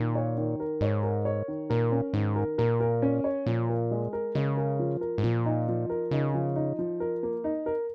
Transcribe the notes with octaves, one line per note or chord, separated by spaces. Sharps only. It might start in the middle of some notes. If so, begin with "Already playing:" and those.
Already playing: A#2 D#3
C#5
D#3
A#4
G#2 C#5
A#4
C#5
D#3
A#2 A#4
C#4
G#2 D#3
A#4
A#2 A#4
A#4
C#4
C#5
A#2 F3
A#4
G#3
A#4
C#3 G#3
A#4
F3
A#4
G#2
A#2 F3
D#4
F3
A#4
C#3 D#4
F3
D#4
F3
A#4
A#3
D#4
A#4